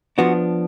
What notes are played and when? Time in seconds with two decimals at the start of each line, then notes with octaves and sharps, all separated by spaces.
0.18 F3 B3 D4 F#4